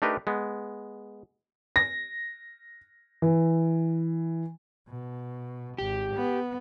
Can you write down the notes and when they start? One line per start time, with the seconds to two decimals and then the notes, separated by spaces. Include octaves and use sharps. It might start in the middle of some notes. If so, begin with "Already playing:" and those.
0.02 A3 D4 D#4 G4 A#4 B4
0.27 G#3 B3
1.76 A#6
3.22 E3
4.88 B2
5.78 G#1 G4
6.14 B3